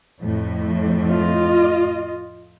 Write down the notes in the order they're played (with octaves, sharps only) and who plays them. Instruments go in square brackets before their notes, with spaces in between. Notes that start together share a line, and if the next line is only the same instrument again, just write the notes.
[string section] F2 A2
[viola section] F4 D#5